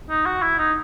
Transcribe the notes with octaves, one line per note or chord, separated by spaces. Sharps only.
D#4
F#4
E4
D#4